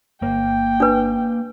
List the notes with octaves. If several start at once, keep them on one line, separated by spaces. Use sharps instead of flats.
G1 A#3 G5
D4 B4